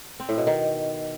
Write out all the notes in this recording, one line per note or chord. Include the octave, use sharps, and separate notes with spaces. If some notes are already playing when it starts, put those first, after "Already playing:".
C4
A2
B2
D#3